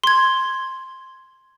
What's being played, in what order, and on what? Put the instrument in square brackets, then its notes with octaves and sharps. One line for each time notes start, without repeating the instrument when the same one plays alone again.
[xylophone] C6 G#6